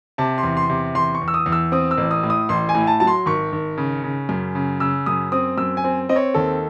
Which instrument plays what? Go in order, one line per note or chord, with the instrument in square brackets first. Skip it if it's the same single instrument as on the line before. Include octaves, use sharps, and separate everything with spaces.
[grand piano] C3 A5
C6
E2
C6
C3
E2 C6
C#6
E2
E6
D#6
E2
E6
C4 D#6
E6
A1
D#6
A2
D#6
A1 C6
G#5
A2
A5
F#3 A5
C6
G#1 C#6
G#1
C#3
C#3
F#2
C#3
C#3 E6
F#2 D#6
C4 D#6
F#2 E6
G#5
C4
C4 D#5
C#5
D#2 A4